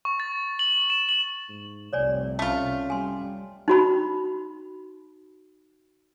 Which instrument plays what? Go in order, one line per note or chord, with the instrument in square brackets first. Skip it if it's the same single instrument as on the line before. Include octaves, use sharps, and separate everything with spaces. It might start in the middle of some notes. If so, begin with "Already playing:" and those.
[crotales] C#6
A6
F#7
E7
F#7
[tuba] G#2
[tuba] F1 [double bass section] C2 C3 [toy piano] C#5 D5 G#5
[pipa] A3 F4 [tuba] C#4
[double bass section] G3 [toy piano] G#5 C6
[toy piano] D#4 F#4 B5